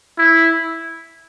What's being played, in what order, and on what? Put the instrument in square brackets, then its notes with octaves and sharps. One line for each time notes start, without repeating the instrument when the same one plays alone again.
[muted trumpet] E4